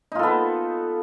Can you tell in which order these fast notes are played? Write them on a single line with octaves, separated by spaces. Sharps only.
D#4 F4 A4 B3